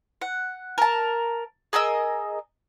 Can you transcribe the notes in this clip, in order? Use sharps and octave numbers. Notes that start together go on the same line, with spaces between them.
F#5
A#4 A5
G#4 A#4 D#5 E6